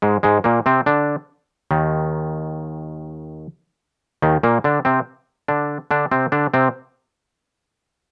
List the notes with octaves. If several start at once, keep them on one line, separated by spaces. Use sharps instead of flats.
G#2 G#3
G#2 G#3
A#2 A#3
C3 C4
D3 D4
D#2 D#3
D#2 D#3
A#2 A#3
D3 D4
C3 C4
D3 D4
D3 D4
C3 C4
D3 D4
C3 C4